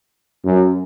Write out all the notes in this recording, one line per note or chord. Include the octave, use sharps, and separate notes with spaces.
F#2